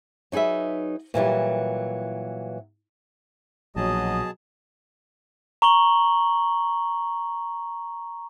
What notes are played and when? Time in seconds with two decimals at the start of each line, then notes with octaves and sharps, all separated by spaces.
0.32 F#3 D#4 G#4 B4 E5
1.14 A#2 E3 F#3 G3
3.76 A#1 B2 F#3 G#4 D#5 A5
5.62 A#5 C#6 F#7 G7